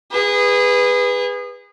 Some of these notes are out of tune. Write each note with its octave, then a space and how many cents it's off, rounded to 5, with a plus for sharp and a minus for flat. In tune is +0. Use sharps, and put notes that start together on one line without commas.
G#4 -25 B4 +0